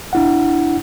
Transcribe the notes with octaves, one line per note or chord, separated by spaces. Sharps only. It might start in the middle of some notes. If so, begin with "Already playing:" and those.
D4 E4 F#5